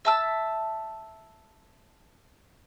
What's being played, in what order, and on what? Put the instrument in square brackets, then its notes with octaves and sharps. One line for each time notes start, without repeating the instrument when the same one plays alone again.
[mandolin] E5 A5 E6